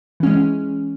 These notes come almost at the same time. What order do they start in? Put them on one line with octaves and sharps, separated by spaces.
E3 C#4 G#3